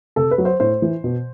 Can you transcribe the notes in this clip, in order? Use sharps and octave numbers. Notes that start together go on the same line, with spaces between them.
C3 A4
B4
F#3
C5
A2 C5
E3
B2